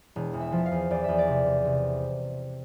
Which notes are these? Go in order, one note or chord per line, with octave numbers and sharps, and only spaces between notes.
E1
E2
E5
F3
F5
E2
E2 D5
E2 E5
D5
C3
C3
C3